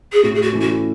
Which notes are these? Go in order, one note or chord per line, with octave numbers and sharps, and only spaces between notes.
G#4
A2 F#4
G#4
F#4
E3 A3 C#4
F#4